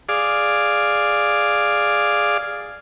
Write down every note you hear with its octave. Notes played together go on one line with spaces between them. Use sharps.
G#4 D5 F5